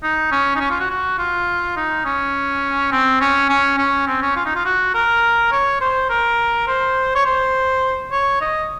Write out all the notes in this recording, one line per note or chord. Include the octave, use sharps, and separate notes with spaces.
D#4
C#4
D#4
C#4
F4
F#4
F#4
F4
D#4
C#4
C4
C#4
C#4
C#4
C4
C#4
F4
D#4
F4
F#4
A#4
C#5
C5
A#4
C5
C#5
C5
C#5
D#5